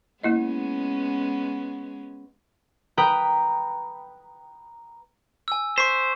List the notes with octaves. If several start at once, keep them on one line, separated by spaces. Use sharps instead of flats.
G#3 A#3 B3 C#4 E4 D#5
B4 G5 A#5 D#6 F#6
G#5 E6
C5 C#6 B6